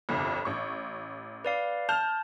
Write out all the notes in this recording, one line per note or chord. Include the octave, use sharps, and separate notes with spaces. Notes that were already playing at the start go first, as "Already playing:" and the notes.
G1 C2 F2
A1 C#6
B4 D5 F5
A5 F6 G6 F7